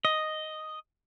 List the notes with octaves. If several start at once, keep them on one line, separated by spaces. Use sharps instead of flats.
D#5